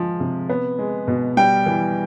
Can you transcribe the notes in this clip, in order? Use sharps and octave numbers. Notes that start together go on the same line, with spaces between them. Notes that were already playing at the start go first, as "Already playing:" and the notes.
Already playing: F3 G#3
C3
B3
G#3
B2
G3 G5
E3